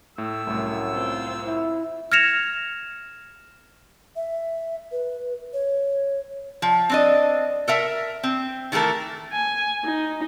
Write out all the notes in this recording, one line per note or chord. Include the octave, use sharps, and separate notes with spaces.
A2 A3 E6
C2 F#2 A2
C4 F4
E4
F6 G#6 A#6 C#7 E7 F7
E5
B4
C#5
F3
C4 D4 D#5
A4 A#4 E5
C4
D#3 E3 A3 A4 A#4
G#5
D#4